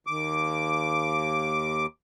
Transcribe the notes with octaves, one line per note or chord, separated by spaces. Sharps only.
D#2 D6